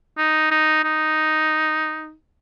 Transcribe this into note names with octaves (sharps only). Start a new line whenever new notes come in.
D#4
D#4
D#4